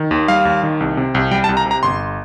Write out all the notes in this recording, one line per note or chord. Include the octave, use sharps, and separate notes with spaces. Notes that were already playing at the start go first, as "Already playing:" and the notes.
Already playing: D#3
D#2
G3 F5
D#2
D#3
C2
C3
C2
G3 G5
A5
C2
A#5
C3
A#5
G1 C6